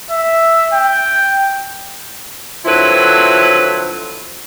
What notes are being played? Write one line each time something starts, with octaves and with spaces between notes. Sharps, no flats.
E5
G5
D3 F3 F#3 C4 E4 B4